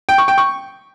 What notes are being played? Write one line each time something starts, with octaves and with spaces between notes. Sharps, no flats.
G5
C#6
G5
C#6